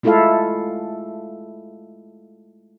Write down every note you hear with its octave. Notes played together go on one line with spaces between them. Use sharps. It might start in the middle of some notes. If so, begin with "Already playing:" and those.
G#3 A3 E4 F4 A4 F5